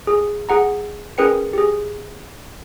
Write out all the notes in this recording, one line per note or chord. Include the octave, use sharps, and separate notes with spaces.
G#4
G#4 F#5 A#5
C#4 G#4 A#4 B4 G5 C#7
G4 G#4